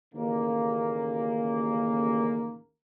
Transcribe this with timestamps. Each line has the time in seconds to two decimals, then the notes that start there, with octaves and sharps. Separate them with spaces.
0.15 A1 D#2 C#3 A#3